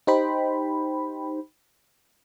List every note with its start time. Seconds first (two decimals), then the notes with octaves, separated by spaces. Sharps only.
0.07 D#4 G4 C5 G5 B5